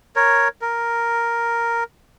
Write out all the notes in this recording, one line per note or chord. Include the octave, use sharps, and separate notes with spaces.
A#4 C#5
A#4